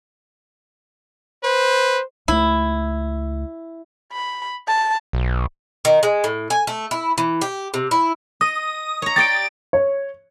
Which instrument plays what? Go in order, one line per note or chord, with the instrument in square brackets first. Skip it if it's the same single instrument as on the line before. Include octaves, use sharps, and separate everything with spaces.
[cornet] B4 [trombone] C5
[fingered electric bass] C#2 A3 [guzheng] E4
[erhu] B5
A5
[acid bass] B1
[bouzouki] D#3
G#3
A2
G#5
A3
E4
E3
G4
C3
E4
[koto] D#5 [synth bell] D#6
[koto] C#5 A#5
[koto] G4 D5 G5 [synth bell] A6 D7
[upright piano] C#5